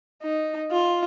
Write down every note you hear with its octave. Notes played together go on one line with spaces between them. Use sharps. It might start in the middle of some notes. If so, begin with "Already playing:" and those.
D#4
F4